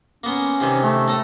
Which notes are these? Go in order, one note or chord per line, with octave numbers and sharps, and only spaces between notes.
A#3 B3 C#4 C6
C3 D#3 E3
A3
A2 A4 A#5